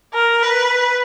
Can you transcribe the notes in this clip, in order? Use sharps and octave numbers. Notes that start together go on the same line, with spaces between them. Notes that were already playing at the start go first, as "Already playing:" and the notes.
A#4
B4